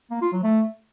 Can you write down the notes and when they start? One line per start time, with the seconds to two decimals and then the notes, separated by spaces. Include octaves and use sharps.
0.11 A#3
0.22 F4
0.33 F#3
0.43 A3